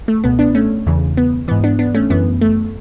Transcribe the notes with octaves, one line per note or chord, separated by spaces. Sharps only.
A3
C#2 B2 B3
B3 D4
A3 C#4
E2 C#3 E3
B3
G#2 E3 B3
B3 D4
B3 D4
A3 C#4
F#2 E3 B3
A3